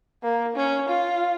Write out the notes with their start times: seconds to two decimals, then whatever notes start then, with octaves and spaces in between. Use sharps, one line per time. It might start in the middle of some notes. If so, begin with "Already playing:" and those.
0.23 A#3
0.56 C#4
0.89 F4